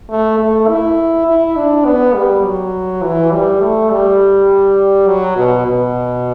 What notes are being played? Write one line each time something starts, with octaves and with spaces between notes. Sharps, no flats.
A3
A3
E4
E4
D4
B3
G3
F#3
E3
G3
A3
G3
F#3
B2
B2